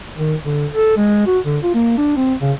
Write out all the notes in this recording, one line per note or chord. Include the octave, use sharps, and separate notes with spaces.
D#3
D3
A4
G#3
F#4
D3
F4
A#3
D4
C4
C#3